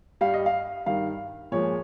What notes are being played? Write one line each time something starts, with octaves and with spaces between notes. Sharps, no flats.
G2 G3 F5
D#5
F5
G2 D#3 G3 F5
A#2 F3 G#3 C#5